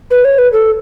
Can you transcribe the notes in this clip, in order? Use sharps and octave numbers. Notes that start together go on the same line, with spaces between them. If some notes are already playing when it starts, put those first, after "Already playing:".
B4
C#5
B4
A4